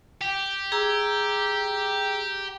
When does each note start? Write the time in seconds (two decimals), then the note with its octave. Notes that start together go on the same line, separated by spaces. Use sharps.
0.21 G4
0.72 G#4 A#5 E6